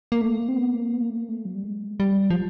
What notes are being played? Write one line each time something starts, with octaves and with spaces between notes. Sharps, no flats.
A#3
A3
A#3
C4
B3
A#3
B3
A#3
A3
A#3
A3
F#3
G3
G#3
G3
F3